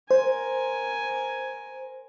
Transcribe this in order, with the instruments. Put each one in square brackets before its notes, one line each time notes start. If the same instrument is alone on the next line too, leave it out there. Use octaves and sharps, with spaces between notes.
[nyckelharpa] A#4 G#5 [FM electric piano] C5